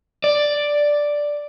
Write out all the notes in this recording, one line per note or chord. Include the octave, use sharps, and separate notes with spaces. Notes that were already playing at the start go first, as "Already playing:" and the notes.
D5